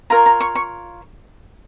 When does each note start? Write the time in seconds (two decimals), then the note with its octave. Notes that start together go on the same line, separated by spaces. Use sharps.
0.10 F4 A#4 C#5 A#5
0.26 A#5
0.41 C#6
0.55 C#6